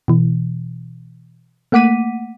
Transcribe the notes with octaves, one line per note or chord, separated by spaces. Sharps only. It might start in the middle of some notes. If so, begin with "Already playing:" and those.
B2 E3
A3 A#3 F#5 D6 B6 D#7